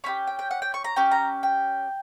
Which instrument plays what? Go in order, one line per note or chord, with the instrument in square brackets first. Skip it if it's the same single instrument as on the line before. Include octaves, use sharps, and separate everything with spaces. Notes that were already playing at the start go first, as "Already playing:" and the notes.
[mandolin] C#4 E4 G4 B5
G5
G5
F#5
G5
C#6
A#5
C#4 G4 G5
A#5
G5